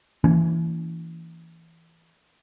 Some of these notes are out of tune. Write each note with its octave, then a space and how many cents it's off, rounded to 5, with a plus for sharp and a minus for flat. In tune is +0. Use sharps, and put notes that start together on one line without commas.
E3 +5 A#3 -20 C#4 +30